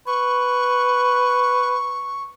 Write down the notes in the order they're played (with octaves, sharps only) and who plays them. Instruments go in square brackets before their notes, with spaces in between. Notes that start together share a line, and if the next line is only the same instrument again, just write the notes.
[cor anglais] B4 [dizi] C#6